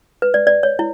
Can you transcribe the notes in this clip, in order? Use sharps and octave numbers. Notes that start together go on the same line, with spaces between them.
B4
D5
D5
C#5
E4